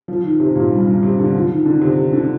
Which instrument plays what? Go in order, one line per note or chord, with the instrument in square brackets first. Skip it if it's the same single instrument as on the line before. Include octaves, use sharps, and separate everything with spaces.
[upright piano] F3
D#3
C3
A#2
G2
G2
C3
D3
F3
D#3
D3
C3
D3